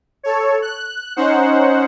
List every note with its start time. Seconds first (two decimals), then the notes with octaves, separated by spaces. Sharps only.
0.23 A4 C#5
0.62 F#6
1.16 C#4 D#4 C5 F#5